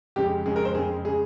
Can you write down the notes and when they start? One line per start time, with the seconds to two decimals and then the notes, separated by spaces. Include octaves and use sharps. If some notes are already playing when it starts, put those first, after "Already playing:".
0.16 F2 C#3 G#3 G4
0.46 F2 C#3 G#3 G#4
0.56 A#4
0.65 C5
0.75 F2 C#3 G#3 G#4
1.05 C#3 G#3 G#4